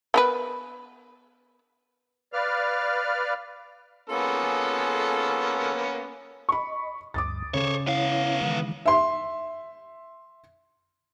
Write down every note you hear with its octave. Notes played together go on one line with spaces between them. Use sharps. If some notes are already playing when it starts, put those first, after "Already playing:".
B3 A#4 B4
B4 D5 F5 F6
A#3 B3 C#4 F4 G#4 A4
D#5 B5 C#6
D2 G2 D6 D#6 A6
C#3 A4 C5 C#5
B3 C#4 E4 C#5 F5
D#3 E3 G#3
E5 C6